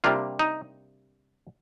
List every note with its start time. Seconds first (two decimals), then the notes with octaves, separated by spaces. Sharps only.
0.04 C3 G3 A#3 D4 F4
0.39 D#4